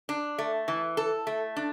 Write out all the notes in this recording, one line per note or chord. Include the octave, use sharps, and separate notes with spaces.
D4
A3
E3
A4
A3
D4